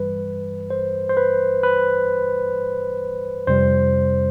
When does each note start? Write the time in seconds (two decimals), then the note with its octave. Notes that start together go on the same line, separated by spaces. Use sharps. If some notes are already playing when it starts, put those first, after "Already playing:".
Already playing: G2 E3 G3 B4
0.70 C5
1.09 C5
1.17 B4
1.63 B4
3.47 F2 C3 G3 C5